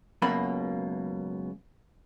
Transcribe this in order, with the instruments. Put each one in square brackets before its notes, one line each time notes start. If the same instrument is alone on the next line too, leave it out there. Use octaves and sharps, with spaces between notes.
[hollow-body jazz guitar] C#2 F#2 B2 A#3 B5